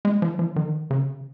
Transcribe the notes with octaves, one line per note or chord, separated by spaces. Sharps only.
G#3
F3
F3
D#3
C#3